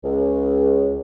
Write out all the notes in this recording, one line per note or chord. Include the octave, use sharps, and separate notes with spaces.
C#2